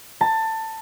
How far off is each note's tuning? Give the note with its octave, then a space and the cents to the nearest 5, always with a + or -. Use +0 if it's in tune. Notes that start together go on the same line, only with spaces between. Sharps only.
A5 +20